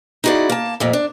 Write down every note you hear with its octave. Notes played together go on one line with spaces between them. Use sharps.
D#4 E4 F#4 G#4 D5
A#3 A5
F2 A#2 A3
D4